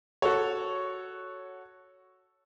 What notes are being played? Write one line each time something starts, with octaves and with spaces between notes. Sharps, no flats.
F#4 A4 C#5